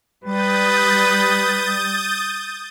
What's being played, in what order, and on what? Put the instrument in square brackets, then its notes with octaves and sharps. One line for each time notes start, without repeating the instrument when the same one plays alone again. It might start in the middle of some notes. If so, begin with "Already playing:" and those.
[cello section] G3 [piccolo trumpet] B4 [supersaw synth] D#6 G6 A6